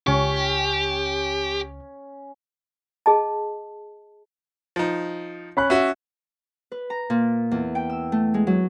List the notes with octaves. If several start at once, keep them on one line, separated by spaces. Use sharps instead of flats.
C#2 C#4 G4 C#6
G#4 D#5 A5
F3 D#4
C#4 B5 F#6
C#4 F#4 E5
B4
A#5
A#2
E2
G5
E6
A3
G#3
F#3